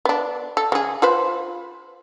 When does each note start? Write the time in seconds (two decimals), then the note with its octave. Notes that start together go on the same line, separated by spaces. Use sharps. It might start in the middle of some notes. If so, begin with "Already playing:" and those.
0.05 B3 D4
0.57 A4
0.72 C#3 G#4
1.02 F4 B4 C5